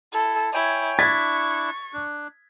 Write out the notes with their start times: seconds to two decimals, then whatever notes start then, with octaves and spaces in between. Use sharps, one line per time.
0.13 E4 A4
0.54 E4 C#5 G5 G#5
0.99 D4 E4 C#6 G#6 A6 B6
1.93 D4